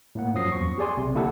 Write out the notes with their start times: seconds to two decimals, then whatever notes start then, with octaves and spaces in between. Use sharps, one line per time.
0.15 A2 A#3 F#5
0.35 F#2 F3 F#3 D#6 A#6 C7
0.52 E2 C#6
0.78 G4 G#4 D5 G#5 C6
0.97 B1 C3
1.14 D3 A#3 E4 G4 A4 F#5